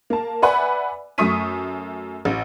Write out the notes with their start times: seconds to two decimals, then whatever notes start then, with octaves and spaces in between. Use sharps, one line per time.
0.10 A#3 A5
0.42 B4 D5 E5 F#5 G#5 B5
1.18 F#2 A3 C#6 D#6 B6 D#7
2.25 A1